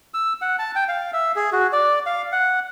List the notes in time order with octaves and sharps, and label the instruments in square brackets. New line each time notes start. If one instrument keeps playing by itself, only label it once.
[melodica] E6
F#5
A5
G5
F5
E5
G#4
F#4
D5
F5
F#5